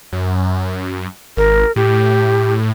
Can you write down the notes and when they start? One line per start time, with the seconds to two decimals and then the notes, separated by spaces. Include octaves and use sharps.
0.13 F#2
1.37 G#1 A#4
1.76 A2 G4